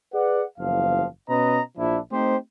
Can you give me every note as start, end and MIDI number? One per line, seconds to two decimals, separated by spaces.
0.13 0.42 68
0.13 0.42 71
0.13 0.42 74
0.13 0.42 78
0.58 1.05 30
0.58 1.05 40
0.58 1.05 53
0.58 1.05 77
1.29 1.60 47
1.29 1.60 61
1.29 1.60 71
1.29 1.60 75
1.29 1.60 82
1.77 1.98 34
1.77 1.98 53
1.77 1.98 62
1.77 1.98 64
2.11 2.36 57
2.11 2.36 60
2.11 2.36 63
2.11 2.36 67
2.11 2.36 72